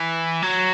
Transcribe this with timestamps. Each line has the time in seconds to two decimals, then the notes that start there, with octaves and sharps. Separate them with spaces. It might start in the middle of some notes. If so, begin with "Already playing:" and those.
Already playing: E3
0.43 F#3